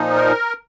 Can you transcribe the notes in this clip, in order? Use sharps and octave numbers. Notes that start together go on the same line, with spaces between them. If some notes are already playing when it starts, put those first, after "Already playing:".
Already playing: A#2 F3 D#4
A#4